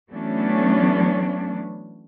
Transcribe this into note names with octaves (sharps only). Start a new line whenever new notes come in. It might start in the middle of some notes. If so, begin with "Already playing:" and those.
E3 F#3 A3 B3 C#4 D4